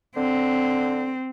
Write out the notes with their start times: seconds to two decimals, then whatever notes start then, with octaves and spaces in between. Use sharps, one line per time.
0.16 D3 C4